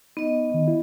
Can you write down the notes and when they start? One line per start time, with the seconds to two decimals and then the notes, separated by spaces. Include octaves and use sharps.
0.17 B3 D#4 D#5
0.54 D#3
0.68 E4